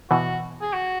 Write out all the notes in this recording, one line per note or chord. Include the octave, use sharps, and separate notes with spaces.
B2 E3 F#4
G#4
F#4